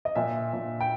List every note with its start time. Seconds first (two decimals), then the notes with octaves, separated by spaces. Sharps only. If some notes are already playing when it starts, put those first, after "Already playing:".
0.05 D#5
0.15 A#2 E5
0.53 A#2
0.80 G5